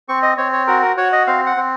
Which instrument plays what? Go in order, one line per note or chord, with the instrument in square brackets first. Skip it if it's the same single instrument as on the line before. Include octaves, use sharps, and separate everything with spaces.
[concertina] C4 C#6
D#5
C4 C#5
C#5
F#4 A#4
A#4
F#4 C#5
D#5
C4 F5
F#5
C4